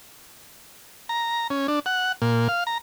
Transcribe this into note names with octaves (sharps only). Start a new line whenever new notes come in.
A#5
C#4
D4
F#5
A#2
F5
A#5